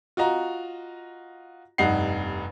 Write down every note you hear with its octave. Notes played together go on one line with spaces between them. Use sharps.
F4 F#4 D#5 A#5
F1 G2 D#4 F#5 C7